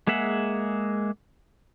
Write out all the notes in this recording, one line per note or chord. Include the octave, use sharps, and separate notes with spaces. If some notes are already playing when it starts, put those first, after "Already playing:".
G#3 A#3 G#4 E5 F#5